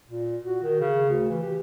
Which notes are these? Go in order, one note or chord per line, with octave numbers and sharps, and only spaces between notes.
A#2
F#4
D#3
C#3
D2
E3
G4